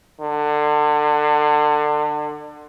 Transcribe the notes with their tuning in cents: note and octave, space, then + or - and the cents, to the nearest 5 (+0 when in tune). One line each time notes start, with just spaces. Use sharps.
D3 +30